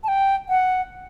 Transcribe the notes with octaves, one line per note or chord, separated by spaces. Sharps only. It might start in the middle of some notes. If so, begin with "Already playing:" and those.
A5
G5
F#5